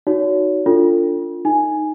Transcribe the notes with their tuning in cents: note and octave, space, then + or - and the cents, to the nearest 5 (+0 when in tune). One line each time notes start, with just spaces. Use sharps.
D#4 +0 F#4 +0 C#5 +40
D4 -15 F4 +0 A4 +35
D#4 +0 G#5 +0